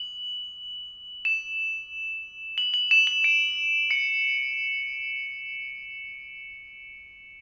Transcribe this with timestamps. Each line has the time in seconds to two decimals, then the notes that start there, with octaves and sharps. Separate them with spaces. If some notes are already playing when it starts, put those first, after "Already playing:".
Already playing: F#7
1.25 E7
2.58 F#7
2.74 F#7
2.91 E7
3.07 F#7
3.24 D7
3.91 C#7